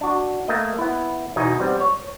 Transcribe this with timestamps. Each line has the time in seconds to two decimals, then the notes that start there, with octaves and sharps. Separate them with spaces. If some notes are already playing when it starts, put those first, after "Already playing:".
0.01 D4 F#4
0.48 A3 A#3 D#5
0.78 B3 E4
1.36 E2 B2 D#4 D#5 G#5
1.60 G3 B3 C4
1.80 C#5